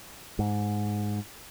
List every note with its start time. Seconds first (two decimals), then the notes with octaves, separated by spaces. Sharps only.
0.39 G#2